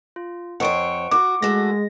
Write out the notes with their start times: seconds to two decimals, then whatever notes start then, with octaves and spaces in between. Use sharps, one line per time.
0.16 F4
0.60 F2 C5 C#5 F#5 C#6 D7
1.11 F#4 D6
1.42 G#3 A3 F#4 A#6